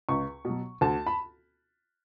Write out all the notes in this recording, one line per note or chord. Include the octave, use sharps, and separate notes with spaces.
C#2 C#6
B2 F#3
D2 A5
B5